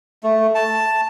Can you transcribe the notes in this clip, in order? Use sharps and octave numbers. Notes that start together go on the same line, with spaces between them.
A3
A5